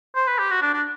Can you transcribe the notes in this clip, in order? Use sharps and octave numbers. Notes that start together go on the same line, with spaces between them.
C5
B4
G4
F#4
D4
D4